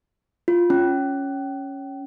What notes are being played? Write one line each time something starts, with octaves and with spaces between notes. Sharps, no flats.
F4
C#4